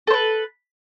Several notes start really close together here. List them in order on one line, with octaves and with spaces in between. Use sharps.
A4 C5 B4